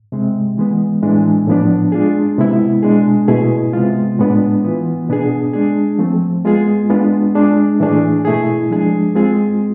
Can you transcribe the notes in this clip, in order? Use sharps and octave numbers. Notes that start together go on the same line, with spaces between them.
C3 G#3 C4
E3 G#3 B3
A2 E3 G#3 D4
A2 F3 B3 D4
G#3 D4 F4 G#4
C3 G#3 B3 E4
B2 G#3 D4 G#4
B2 A3 E4 G#4
C3 G#3 B3 F4
A2 G#3 B3 D4
E3 B3 F4
B2 B3 D4 G#4
G#3 D4 G#4
F3 A3 C4
G#3 B3 F4 G#4
G#3 B3 D4 F4
G#3 D4 G#4
A2 E3 A3 D4 G#4
B2 A3 E4 G#4
F3 G#3 D4 G#4
G#3 C4 F4 G#4